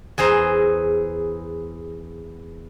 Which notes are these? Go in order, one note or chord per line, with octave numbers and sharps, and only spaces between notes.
E2 G#4 C5 A#5